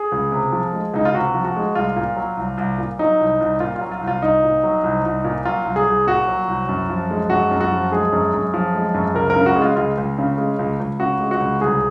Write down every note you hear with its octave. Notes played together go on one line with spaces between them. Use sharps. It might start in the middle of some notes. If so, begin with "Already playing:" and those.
Already playing: G#4
C#2
C3
F3
G#3
C#2 D#4
F4
C3 F#4
F3
F#4
G#3
C2 F4
A#2
F#3
C2
C2
A#2
F#3 D#4
C2
C2
A#2 F4
F4
F#3
F4
C2
F4
C2 D#4
A#2
F#3
C2
C2
A#2
F#3 F4
C2
G#4
C2
A#2 F#4
F#3
C2
F#2
F3
G#3
F#2 F#4
F#2
F#4
F3
G#3 G#4
F#2
F#2
F3
G#3
F#2
C#2 A#4
A#4
C#3
F#4
G#3
F4
C#2 F4
C#2
C#3
G#3
C#2
C#2
C#3 F#4
G#3
F#4
C#2
C2 G#4